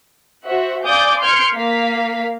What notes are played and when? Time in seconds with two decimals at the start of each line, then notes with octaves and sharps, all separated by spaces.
0.47 F#4 C5 E5 F#5
0.86 D5 F5 G#5 D6 D#6 G6
1.21 C6 F6 G6 G#6 C#7 D7
1.55 A#3 F5 B6